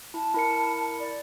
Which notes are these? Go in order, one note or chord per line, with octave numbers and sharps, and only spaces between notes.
E4 A5
E4 A#4 C#7
D5